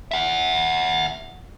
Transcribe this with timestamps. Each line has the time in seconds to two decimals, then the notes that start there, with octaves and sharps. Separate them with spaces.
0.11 E5 F#5